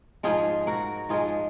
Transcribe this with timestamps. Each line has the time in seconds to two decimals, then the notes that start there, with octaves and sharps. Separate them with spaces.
0.23 G#2 F3 G#3 F4 G#4
0.67 F#4 A#4
1.09 G#2 F3 G#3 F4 G#4